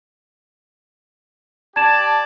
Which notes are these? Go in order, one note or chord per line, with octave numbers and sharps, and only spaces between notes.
G4 D5 A5 G#6 E7